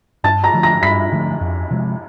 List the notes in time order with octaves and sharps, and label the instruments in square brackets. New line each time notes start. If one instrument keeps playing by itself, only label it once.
[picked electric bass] G2 [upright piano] A5 A6
[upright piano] A#5 A#6
[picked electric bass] D3 F3 A3
[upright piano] A#5 A#6
[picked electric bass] G2 [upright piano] B5 B6
[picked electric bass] D3 F3 A3
F2
C3 F3 G#3